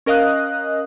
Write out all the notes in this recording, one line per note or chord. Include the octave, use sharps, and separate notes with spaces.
C#4 A#4 D#5 F5 D#6 F#6